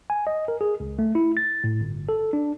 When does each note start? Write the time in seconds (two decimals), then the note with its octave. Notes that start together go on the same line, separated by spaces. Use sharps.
0.10 G#5
0.27 D#5
0.48 A#4
0.61 G#4
0.80 C#2
0.99 A3
1.15 E4
1.37 A6
1.64 A2
1.81 G1
2.09 A4
2.33 D4